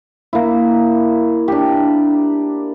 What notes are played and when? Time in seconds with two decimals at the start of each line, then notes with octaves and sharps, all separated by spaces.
0.33 A#3 E4
1.48 D4 G4